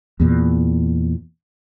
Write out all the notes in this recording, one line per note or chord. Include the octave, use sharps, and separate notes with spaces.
E2 A#2